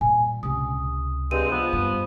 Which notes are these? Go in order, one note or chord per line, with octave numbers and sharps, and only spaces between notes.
A#2 G3 G#5
C#2 C3 D#6
G2 G#3 C4 D#7
F3 B3
G2